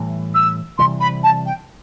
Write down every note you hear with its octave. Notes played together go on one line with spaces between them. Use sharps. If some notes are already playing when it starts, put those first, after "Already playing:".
Already playing: A2 E3 G3
E6
C3 E3 G3 C6
B5
A5
G5